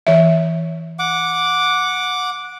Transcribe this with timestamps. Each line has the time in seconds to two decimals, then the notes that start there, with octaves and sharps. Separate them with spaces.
0.07 E3 E5
0.99 F#5 D6